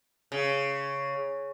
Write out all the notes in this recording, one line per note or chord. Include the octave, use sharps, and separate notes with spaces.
C#3